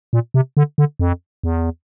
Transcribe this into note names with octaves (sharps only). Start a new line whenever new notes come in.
A#2
C3
D3
D3
F2
E2